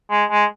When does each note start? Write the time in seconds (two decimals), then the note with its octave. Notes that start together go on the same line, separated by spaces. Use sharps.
0.10 G#3
0.31 G#3